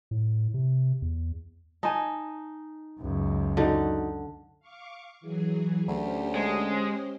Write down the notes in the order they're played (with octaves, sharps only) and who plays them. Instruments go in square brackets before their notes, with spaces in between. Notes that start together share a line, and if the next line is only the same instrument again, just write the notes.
[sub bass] A2
C3
E2
[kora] D#4 [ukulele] G#5 A5
[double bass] C#2 F#2
[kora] D3 [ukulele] D#4 F#4
[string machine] F5 C#6 D6
E3 F#3 G#4
[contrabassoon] D2 [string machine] C#4 G4 C5
[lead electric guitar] G#3